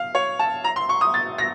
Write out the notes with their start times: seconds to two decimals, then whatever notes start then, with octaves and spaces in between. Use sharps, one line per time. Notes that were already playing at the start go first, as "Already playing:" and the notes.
Already playing: F5
0.15 C#5
0.39 A5
0.64 A#5
0.76 C6
0.89 C#6
1.01 D#6
1.14 A6
1.38 A#6